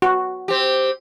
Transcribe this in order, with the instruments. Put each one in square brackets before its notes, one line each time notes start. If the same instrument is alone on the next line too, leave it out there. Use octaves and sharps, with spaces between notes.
[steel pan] F#4
[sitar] C4 G4